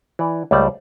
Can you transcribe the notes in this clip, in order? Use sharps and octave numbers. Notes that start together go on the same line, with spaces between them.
E3 D5
C#2 G3 A3 C5 D5